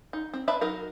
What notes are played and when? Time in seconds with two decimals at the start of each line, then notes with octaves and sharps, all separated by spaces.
0.13 D#4
0.33 C4
0.48 D4 B4 E5 A5 B5
0.61 F#3 D#4 A#4